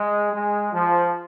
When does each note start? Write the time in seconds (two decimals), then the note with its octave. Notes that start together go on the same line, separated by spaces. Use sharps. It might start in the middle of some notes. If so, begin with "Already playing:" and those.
Already playing: G#3
0.33 G#3
0.73 F3